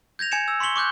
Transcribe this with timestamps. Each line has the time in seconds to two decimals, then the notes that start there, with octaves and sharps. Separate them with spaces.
0.19 G6 G#6 A#6 F7
0.31 G#5 G#6 C#7 E7
0.48 E6 G#6
0.60 C6 C#6 B6 C#7 F#7 G7
0.76 C#6 D6 F#6 G6